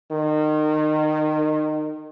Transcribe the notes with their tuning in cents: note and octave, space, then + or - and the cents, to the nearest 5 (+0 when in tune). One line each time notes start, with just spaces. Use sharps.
D#3 -25